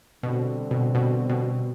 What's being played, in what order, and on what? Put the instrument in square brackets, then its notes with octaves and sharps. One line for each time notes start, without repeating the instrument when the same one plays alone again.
[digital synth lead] B2 [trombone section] D3 G3 C4
[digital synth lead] B2
B2
B2